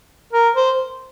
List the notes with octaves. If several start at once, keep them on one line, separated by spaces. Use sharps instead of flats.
A#4
C5